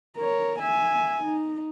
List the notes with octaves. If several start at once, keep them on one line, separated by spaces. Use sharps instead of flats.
A#4 C#5
E5 G#5
D#4